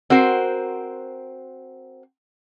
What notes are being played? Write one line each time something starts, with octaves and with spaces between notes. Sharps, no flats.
C4 F#4 A#4 C5